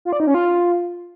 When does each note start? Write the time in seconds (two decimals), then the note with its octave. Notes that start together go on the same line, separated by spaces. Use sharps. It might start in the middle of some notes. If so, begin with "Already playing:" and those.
0.05 F4
0.13 D5
0.20 D#4
0.27 C#4
0.34 F4